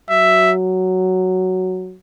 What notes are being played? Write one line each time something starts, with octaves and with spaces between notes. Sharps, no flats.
F#3 E5